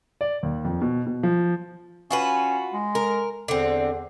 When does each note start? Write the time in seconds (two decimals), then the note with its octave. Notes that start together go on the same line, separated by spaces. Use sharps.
0.21 D5
0.43 D#2
0.65 F2
0.82 B2
1.07 B2
1.23 F3
2.11 C#4 F4 F#4 B4
2.73 G#3
2.95 A#4
3.48 E2 D3 C4